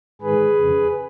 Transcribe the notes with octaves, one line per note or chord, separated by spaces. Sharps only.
G#2 D#3 G#4 B4
F2 C#3